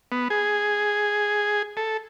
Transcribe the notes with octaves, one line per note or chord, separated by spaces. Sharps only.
B3
G#4
A4